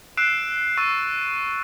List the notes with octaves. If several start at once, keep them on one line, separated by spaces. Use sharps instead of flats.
E6 F#6 C7 D7 E7
C#6 E6 A6 C7 D#7